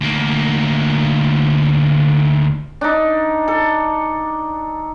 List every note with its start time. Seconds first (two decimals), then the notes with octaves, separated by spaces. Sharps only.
0.01 D2 A#3
2.81 D4 D#4
3.48 A4